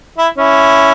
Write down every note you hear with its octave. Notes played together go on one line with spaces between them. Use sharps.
E4
C#4 E4